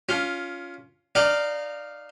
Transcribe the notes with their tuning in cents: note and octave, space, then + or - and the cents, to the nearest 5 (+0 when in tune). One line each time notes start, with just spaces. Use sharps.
C#4 +25 F4 +0
D#4 -20 D5 +0 F5 +0